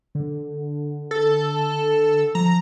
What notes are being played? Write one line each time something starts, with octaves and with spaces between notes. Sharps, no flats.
D3
A4
F3 A#5